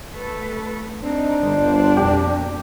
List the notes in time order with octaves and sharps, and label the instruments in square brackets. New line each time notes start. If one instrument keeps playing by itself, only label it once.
[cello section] A3 A4 B4
[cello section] C4 D#4 [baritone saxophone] D4
[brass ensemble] G1 [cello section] G3 C5
[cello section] F2 B2 A#3 [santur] G4